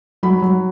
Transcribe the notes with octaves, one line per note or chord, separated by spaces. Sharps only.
F#3 B5
F#3